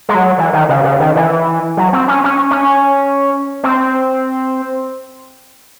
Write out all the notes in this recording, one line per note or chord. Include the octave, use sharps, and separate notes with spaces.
G#3
F#3
E3
D#3
C#3
C#3
D#3
E3
F#3
C4
C#4
C#4
C#4
C4